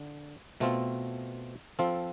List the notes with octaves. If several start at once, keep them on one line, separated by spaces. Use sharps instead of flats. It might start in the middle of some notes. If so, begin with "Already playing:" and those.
Already playing: D3
B2 A3 C4 F4
F3 C4 F4 A4